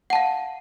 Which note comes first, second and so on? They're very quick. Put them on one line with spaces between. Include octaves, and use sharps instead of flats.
F#5 A5 F5